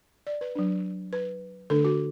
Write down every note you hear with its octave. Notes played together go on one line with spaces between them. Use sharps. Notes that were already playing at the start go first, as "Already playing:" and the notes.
D5
B4
F#3 D4
B4
D3 A3 D4 A4
F#4